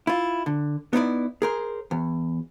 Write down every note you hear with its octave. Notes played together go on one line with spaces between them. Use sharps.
E4 F4
D3
B3 D#4 E4 D5
G#4 A#4 C5
E2